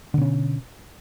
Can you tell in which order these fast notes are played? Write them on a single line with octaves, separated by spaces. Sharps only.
D3 B2 C#4